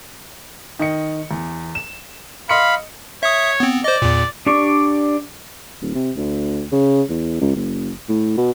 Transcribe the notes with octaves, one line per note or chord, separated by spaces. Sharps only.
D#3 D#5 C#7
E2
E7
D#5 F5 B5 C6 C#7
C#5 E5 D#6
B3 C4
C5 D5 D#5
E2 A#2
D4 G4 D5 C#6
D#1
C3
D2
C#3
E2
C#2
F#1
A2
B2